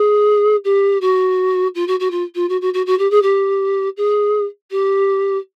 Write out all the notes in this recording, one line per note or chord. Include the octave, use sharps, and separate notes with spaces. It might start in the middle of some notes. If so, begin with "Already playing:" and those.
Already playing: G#4
G4
F#4
F4
F#4
F#4
F4
F4
F#4
F#4
F#4
F#4
G4
G#4
G4
G#4
G4